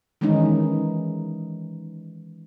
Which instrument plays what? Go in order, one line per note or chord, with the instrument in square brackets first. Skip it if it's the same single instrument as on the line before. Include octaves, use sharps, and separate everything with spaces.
[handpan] D#3 E3 G#3 C#4 D#4